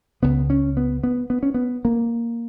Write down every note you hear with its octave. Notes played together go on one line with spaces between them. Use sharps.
C#2 C#3 B3
C#4
B3
B3
B3
C#4
B3
A#3